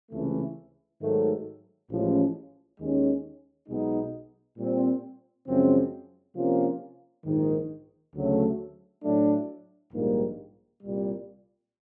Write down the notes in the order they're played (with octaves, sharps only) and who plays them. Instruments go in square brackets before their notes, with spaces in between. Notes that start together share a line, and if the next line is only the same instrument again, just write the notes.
[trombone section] C#2 C3 E3 A3
G#2 D#3 F#3 A3
A1 A2 F3 G#3 C#4
D#2 D#3 G#3 C#4
B1 B2 G#3 B3 D#4
A#2 G3 C4
F#2 C#3 F3 G#3 C4
C3 F3 A#3 C#4 F4
A#1 G#2 D#3
D2 C#3 F#3 A3
A2 F#3 A3 D4
A#1 G#2 D#3 G3 A#3
C2 A#2 G3